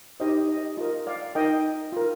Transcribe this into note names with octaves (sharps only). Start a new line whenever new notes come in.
D#4 G4 C5 D#5
D#5
F4 A#4 D#5
D5 F5
D#4 A#4 D#5 G5
F4 A#4